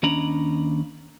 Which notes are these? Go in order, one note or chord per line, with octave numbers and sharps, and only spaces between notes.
D#2 C#4 D4 D#5 A#5 B5